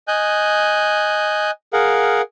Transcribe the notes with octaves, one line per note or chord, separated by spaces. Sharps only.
D#5 G#5 F#6 G6
G#4 A#4 F5 F#5